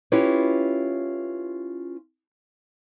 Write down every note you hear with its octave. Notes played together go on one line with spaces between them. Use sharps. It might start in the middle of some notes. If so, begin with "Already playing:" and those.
C#4 E4 F4 G4 B4 C#5